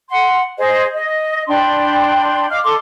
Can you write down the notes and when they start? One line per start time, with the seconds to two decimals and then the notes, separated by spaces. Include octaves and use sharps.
0.09 F#5 C6
0.58 G#4 C5 D#5
0.94 D#5
1.47 D4 G5 B5 C6
2.50 D#5 F5 D6 F6
2.63 A4 C6 D6